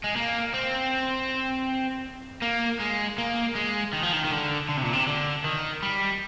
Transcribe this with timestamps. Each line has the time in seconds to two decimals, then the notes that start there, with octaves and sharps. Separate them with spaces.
0.04 G#3
0.16 A#3
0.54 C4
2.42 A#3
2.80 G#3
3.18 A#3
3.55 G#3
3.93 D#3
4.03 F3
4.13 D#3
4.24 D#3
4.31 D3
4.69 D3
4.77 C3
4.85 A#2
4.93 C3
5.07 D3
5.44 D#3
5.82 G3